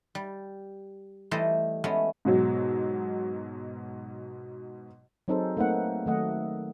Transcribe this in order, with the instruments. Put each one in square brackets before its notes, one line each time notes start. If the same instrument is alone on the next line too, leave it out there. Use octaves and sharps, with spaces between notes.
[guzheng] G3
E3 G3 A3 C5 D#5
G#3 A3 B3 C#4
[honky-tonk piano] G#2 B2 F#3
[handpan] F#3 C4 D#4 G#4 A4 C5
A3 A#3 C4 D#4 B4 F#5
D#3 F#3 A3 D#5 F#5